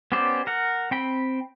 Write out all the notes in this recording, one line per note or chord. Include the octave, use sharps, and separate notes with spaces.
B3 C#4 G4 C5 D5
A#4 F#5
C4 G5 B5